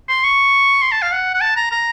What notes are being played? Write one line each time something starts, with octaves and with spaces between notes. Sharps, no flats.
C6
C#6
C6
A5
F5
F#5
F#5
A5
A#5
A#5